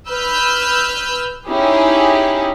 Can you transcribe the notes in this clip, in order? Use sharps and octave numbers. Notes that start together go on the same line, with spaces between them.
B4 E6 F6 G6
C#4 D#4 E4 G4 G#4